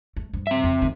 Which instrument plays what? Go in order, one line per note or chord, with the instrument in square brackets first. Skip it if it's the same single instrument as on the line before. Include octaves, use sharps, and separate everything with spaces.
[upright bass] A3
G2 F3
[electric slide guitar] C4 E5
[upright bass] F2
D3 D#3